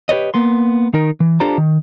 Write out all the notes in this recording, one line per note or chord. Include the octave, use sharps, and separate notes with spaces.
G4 B4 C#5 D#5
A#3 B3 C6
D#3 D#4 A#4
E3
D4 F4 G4 A4 C5 A#5
D#3